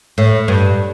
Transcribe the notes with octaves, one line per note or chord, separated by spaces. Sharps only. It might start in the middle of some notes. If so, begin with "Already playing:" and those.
A2
G2